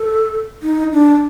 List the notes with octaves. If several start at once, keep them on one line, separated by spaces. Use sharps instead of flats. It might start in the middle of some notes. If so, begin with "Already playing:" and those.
Already playing: A4
D#4
D4